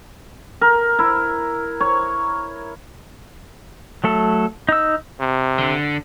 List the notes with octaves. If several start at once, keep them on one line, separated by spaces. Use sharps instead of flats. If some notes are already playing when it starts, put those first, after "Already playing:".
A#4
E4
C#5
F#3 A3 A4
D#4 E6
C3
D3